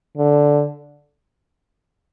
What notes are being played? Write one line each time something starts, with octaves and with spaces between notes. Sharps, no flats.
D3